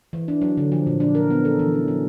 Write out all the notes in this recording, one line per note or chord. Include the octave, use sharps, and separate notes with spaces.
E3
D4
F#3
D3
F3
A#2
D4
A#4
B3
A4
E3
C#4
F#3